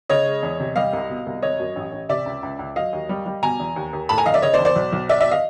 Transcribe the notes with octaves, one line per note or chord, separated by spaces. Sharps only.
C#3 C#5 D#5
G#3
E2
C3
G3 D#5 F5
C2
B2
C2
G#1 C#5 D#5
F#2
A1
A1
C3 D5 E5
C#2
C#2
C#2
F#3 D#5 F5
D#2
G3
G3
B2 G#5 A#5
E2
D#2
D#2
A2 A5 B5
G#5 A#5
A#1 D#5 F5
D5 E5
C#3 C#5 D#5
C5 D5
E2
C5 D5
B1
B1
F#3 D5 E5
D5 E5
D#5 F5